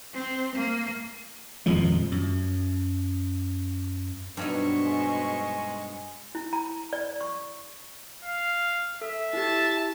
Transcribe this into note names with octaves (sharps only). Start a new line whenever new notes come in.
C4
A#3
D#1 F2 F3 G#3
F#2
G2 B2 F#3 D#4 C5 C#6
G#3
E4
A#5
D5
C#6
F5
A4 E5
E4 G4 A5